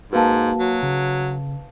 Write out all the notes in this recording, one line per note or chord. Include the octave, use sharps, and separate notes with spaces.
G#2 A#3 F#4 B4 F5 A5
F#3
C#3